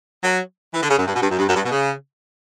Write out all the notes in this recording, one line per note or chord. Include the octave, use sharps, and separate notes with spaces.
F#3
E3
D3
C#3
F#2
G2
B2
G2
F#2
G2
F#2
G2
B2
C#3